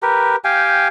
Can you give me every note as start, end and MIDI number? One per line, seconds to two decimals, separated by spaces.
0.03 0.36 67
0.03 0.36 70
0.03 0.36 71
0.44 0.88 67
0.44 0.88 77
0.44 0.88 79
0.44 0.88 80